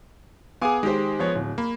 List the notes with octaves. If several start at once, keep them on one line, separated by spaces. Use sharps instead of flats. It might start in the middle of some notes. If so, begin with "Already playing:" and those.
B3 G#4 F5 G#5 D6
D#3 G#3 G4 C5
F3 B3 C#5
D1
A#3 B5